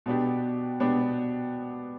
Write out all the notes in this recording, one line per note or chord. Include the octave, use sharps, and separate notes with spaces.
B2 B3 D4 G4
B2 B3 D4 G4